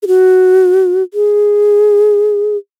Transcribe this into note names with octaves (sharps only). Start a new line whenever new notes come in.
G#4
F#4
G#4